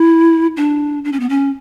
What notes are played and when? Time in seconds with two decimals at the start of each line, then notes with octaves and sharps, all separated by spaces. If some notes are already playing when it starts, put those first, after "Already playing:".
Already playing: E4
0.57 D4
1.04 D4
1.12 C#4
1.20 B3
1.29 C#4